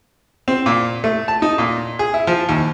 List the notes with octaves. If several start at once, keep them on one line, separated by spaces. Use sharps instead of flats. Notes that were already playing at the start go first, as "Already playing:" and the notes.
C4
A#2
A3
A5
D#4
A#2
G#4
E4
F3
D#2